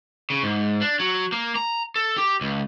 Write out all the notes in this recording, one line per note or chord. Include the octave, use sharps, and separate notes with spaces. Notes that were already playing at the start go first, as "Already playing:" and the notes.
C#3
G#2
D4
F#3
A#3
A#5
A4
G4
C#2